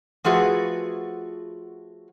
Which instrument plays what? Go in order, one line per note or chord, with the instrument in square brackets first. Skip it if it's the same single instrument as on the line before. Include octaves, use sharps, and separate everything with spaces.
[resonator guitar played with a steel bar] F3 A3 F4 F#4 G#4 B4